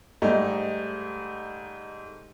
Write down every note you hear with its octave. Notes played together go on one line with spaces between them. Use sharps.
G#2 G3 A3 D#4